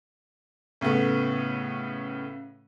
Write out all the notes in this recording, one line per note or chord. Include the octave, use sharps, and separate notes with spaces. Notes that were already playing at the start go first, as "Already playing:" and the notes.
A2 C#3 A3 B3